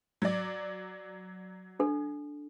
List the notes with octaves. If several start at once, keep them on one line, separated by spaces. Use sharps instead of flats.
F#3 D5
D4 A4